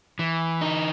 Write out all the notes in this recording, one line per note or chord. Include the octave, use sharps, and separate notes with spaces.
E3
D#4